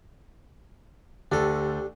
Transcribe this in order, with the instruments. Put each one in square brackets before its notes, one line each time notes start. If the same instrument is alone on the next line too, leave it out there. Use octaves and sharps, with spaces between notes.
[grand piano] D2 A3 [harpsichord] D4 A4 [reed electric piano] G4